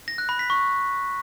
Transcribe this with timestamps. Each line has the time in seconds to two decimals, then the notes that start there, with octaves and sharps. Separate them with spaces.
0.08 A#6
0.18 F#6
0.29 B5
0.39 B6
0.50 C#6